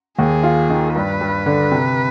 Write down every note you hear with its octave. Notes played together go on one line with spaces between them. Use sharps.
D#2 G#4
F4
D#3
G2 B4
G2
D3
C3